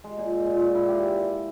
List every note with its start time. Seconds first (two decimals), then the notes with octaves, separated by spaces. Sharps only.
0.04 G#3
0.17 A#2
0.32 G#3
0.46 A#2
0.60 A#2
0.75 E4
0.88 G4